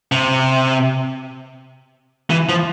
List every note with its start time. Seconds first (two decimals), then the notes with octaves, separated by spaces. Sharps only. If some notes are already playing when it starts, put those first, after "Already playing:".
0.12 C3
2.30 E3
2.49 F3